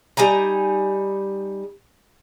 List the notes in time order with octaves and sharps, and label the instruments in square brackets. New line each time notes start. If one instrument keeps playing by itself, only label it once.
[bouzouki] G3 D#4 G#5 A#5